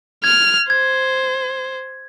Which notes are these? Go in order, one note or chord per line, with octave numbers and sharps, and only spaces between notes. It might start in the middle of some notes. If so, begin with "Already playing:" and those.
F6 G#6
C5 G#6